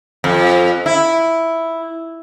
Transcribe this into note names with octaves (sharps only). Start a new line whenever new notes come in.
F2
E4